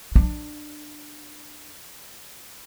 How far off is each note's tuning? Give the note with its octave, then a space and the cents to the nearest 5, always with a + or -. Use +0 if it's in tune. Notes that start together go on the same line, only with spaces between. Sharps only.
D4 +25